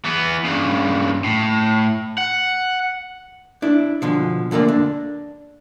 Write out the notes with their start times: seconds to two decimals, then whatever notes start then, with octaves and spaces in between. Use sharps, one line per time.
0.05 E3 B3
0.45 G2 C#3
1.24 A2
2.18 F#5
3.62 D4 E4
4.02 B2 D3 F3
4.51 F2 D3 A3 A#3 D5
4.68 D4